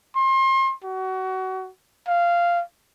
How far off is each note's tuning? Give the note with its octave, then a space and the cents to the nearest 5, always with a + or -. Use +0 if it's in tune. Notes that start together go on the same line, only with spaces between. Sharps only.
C6 +35
F#4 +25
F5 -10